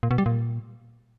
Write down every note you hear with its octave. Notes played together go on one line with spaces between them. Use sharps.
A#2
B2
G3
A#2